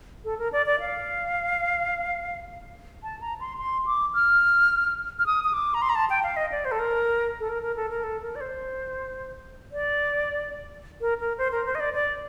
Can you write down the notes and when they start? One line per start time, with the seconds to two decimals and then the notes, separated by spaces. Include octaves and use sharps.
0.25 A4
0.39 A#4
0.52 D5
0.66 D5
0.80 F5
3.03 A5
3.21 A#5
3.40 C6
3.58 C6
3.86 D6
4.14 F6
5.19 F6
5.26 D#6
5.44 D#6
5.53 D6
5.74 A#5
5.82 C6
5.89 A#5
5.95 A5
6.10 G5
6.23 F5
6.37 D#5
6.52 D5
6.65 C5
6.72 A4
6.79 A#4
7.40 A4
7.49 A#4
7.62 A#4
7.77 A4
7.90 A#4
8.04 A4
8.22 A#4
8.35 D5
8.41 C5
9.72 D5
11.01 A#4
11.20 A#4
11.38 C5
11.52 A#4
11.66 C5
11.75 D#5
11.80 D5
11.94 D5